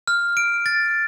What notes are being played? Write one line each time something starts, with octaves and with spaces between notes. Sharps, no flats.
F6
D7
A6